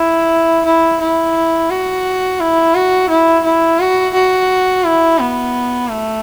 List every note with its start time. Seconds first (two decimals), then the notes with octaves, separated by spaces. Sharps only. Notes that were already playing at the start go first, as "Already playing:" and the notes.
Already playing: E4
0.65 E4
1.00 E4
1.70 F#4
2.40 E4
2.75 F#4
3.10 E4
3.44 E4
3.79 F#4
4.14 F#4
4.84 E4
5.19 B3
5.88 A3